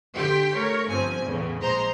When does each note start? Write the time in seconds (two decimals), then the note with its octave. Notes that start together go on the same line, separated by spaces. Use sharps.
0.15 D3 G4 G5 C6 B6
0.56 A3 A#4 C#5
0.88 G1 F3 C4 G#5
1.25 E2 A2 C#3
1.61 A#1 A#2 G#3 C5 A#5 C6